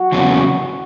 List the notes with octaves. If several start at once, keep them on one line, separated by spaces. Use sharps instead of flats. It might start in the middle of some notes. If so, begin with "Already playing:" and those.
Already playing: F#4
E2 C#3 F#3